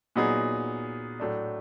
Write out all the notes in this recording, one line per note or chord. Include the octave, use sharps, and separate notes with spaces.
A#2 F#3 B3 D#4 G#4
A2 F#3 A3 D4